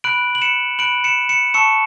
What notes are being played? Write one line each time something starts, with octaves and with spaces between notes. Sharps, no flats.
B5 F#6 D7 F#7
F#7
C#7 E7
B5 F#6 D7 F#7
C#7 E7
C#7 E7
A5 C#6 E6 C#7 E7